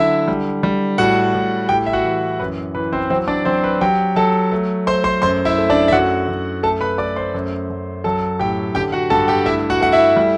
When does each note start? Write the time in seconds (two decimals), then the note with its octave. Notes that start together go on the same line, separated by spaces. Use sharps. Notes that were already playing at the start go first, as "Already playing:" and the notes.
Already playing: D3 F#3 E4 E5
0.28 G3
0.63 G3
0.98 A2 F#4 F#5
1.34 A2
1.69 A2 G4 G5
1.86 E5
1.93 F#4 F#5
2.04 E3
2.40 F#2 B4
2.75 E3 B4
2.92 C4 C5
3.10 F#3 C4 C5
3.28 D4 D5
3.45 F#3 C4 C5
3.64 B4
3.81 F#3 G4 G5
4.16 F#3 A4 A5
4.52 A3
4.87 A3 C5 C6
5.04 C5 C6
5.22 F#2 C5 C6
5.45 E4 E5
5.58 A3
5.70 D4 D5
5.88 E5
5.92 F#2 F#4 F#5
6.28 F#2
6.63 A3 A4 A5
6.81 B4 B5
6.98 A3 D5 D6
7.16 C5 C6
7.34 F#2
7.70 F#2
8.04 F#3 A4 A5
8.39 A2 G4 G5
8.75 D3 G4 G5
8.92 F#4 F#5
9.10 G2 A4 A5
9.28 G4 G5
9.46 A3 E4 E5
9.70 F#4 F#5
9.81 A3 F#5
9.92 E4 E5
10.16 G3